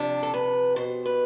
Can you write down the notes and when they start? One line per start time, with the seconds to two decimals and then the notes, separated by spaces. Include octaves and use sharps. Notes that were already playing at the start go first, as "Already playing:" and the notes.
Already playing: C3 F3 D4
0.23 A4
0.34 B4
0.76 B2 C5
1.06 B4